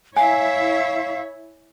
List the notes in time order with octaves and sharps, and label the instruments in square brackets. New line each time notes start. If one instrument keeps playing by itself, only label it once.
[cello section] E4 E5 [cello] C#5 [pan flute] F5 [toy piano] G#5